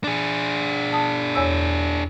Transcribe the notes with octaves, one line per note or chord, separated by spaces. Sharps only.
D4 G#4
A5 D#6
E2 C#5 E6